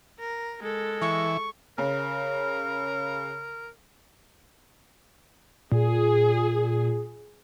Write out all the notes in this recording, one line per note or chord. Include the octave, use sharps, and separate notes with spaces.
A#4
G#3 A4
E3 C#6
C#3 A#4
A#2 G#4